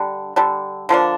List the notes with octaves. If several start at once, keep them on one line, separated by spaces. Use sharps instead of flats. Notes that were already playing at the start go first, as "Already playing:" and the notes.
Already playing: D3 G3 D4
D3 G3 D4
D3 F3 A#3 D4